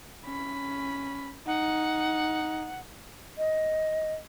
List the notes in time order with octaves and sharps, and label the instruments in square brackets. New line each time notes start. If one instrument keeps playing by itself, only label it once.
[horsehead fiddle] C#4 B5
[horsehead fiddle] D#4 [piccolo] F#5
[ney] D#5